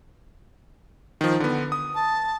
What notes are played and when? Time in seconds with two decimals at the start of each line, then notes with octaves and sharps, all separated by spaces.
1.21 D#3 F3
1.40 D3 B3
1.72 D#6
1.95 A5